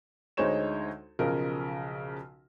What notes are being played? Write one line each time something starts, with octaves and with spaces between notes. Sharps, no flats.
D2 G#3 D#4 C5 C#5 E7
B1 C#3 F3 A#4 D#5